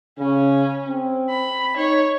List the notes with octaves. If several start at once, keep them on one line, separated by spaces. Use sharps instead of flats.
C#3 C#4
C4
B5
D#4 C#5